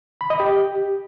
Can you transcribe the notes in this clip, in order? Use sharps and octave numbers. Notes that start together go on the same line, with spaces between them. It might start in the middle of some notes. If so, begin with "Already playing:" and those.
B5
D#5
G4